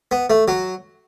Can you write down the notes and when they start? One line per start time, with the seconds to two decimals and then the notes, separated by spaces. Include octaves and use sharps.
0.11 B3
0.30 A3
0.48 F#3